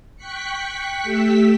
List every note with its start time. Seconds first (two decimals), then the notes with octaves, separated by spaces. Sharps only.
0.16 G5 C#6 F#6 B6 C#7
1.03 A3 G4 E6 B6